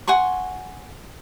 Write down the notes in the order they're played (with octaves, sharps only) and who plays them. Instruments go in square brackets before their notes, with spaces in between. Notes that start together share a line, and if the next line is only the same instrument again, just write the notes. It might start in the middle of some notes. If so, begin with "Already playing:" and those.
[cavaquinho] F#5 G#5 C6 C#6